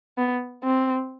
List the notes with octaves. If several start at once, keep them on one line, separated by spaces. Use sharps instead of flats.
B3
C4